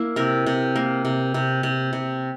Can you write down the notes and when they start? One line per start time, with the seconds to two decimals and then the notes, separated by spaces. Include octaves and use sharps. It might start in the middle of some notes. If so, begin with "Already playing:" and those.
Already playing: A#3 E4
0.16 C3 A#4
0.46 C3
0.76 A#3
1.05 C3
1.34 C3
1.63 C3
1.93 C3